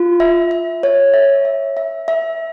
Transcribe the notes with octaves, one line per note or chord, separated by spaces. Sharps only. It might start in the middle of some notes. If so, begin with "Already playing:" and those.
Already playing: F4
E5
E5
C#5
E5
E5
E5
E5